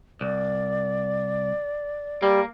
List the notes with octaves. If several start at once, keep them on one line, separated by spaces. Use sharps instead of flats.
C2 D5
G3 A#3